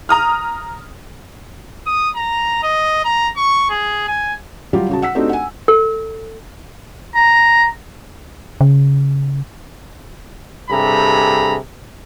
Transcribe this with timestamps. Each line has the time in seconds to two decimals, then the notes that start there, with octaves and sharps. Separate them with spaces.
0.09 A#5 D#6 F6
1.86 D#6
2.16 A#5
2.63 D#5
3.05 A#5
3.37 C#6
3.70 G#4
4.08 G#5
4.73 F#3 G3 F4 G4
4.89 C#3 F#4 A5
5.02 F#5 E6 B6
5.15 A3 C4 D4 D#4 F#4 G4
5.29 F#5 G#5
5.68 A4
7.15 A#5
8.61 C#3
10.70 G2 C3 G#4 A4 A#5 B5